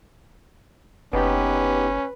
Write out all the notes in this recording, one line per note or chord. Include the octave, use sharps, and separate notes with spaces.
F#1 B3 C#4 D#4 G4 B4